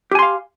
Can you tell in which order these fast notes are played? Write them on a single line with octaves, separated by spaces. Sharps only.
G4 G#5 C6 F5